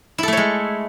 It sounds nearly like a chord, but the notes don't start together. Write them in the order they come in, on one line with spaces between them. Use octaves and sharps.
E4 A4 A3 C#5 G#3